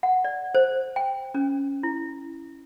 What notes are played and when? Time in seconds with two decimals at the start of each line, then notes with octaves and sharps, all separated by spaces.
0.03 F#5
0.25 D5
0.55 C5
0.96 G5
1.34 C#4
1.83 E4